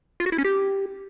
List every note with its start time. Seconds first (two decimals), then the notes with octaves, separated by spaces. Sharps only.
0.20 F4
0.26 F#4
0.32 E4
0.38 C#4
0.44 G4